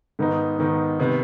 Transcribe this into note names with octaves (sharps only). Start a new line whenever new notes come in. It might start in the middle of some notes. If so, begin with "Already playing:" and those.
G#2 D#3 B3 D#4
G#2 D#3 B3 D#4
C3 D#3 B3